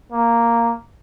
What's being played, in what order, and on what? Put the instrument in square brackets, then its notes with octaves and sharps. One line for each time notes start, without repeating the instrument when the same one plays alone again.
[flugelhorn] A#3